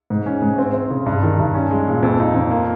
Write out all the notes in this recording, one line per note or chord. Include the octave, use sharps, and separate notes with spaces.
G#2
C#4
G#2
C4
C4
C#3
G2
D#3
G2
C#4
G#3
A#2
F2
D#4
F2
A#3